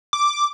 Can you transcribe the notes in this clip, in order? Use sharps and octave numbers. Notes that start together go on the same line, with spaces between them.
D6